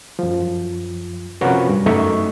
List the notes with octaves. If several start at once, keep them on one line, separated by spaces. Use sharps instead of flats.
F#2 F3
C3 F3 C#4 F#4 A#4 B4
G2
F#2 A3 D#4 E5 C#6